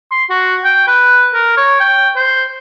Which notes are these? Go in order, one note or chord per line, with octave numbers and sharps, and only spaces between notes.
C6
F#4
G5
B4
A#4
C#5
G5
C5